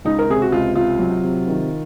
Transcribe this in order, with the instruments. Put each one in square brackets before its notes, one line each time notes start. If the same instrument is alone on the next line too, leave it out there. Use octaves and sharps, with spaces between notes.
[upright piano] C#2 D#4
A#4
C3 G#4
F#4
C#2 F4
C3 F4
F#3
C3
D#3